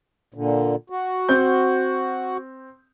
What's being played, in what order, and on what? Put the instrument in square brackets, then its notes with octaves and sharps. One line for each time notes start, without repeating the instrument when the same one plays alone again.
[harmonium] A#2 D3
F#4
[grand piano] C4 G6